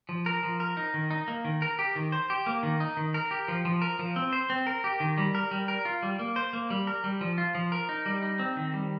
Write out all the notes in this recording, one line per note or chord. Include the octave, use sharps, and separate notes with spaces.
F3
A#4
F3
A#4
D#4
D#3
D#4
A#3
D#3
A#4
G4
D#3
C5
G4
A#3
D#3
D#4
D#3
A#4
G4
F3
F3
A#4
F3
C4
C5
C4
A#4
G4
D#3
G3
A#4
G3
A#4
F4
G3
A#3
C5
A#3
G3
A#4
G3
F3
F4
F3
A#4
D#4
G3
D#4
C4
D#3
G3